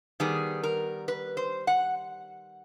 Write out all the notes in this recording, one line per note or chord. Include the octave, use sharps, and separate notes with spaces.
D#3 G3 B3 G#4
A#4
B4
C5
F#5